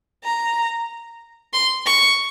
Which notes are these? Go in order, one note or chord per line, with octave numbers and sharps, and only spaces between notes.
A#5
C6
C#6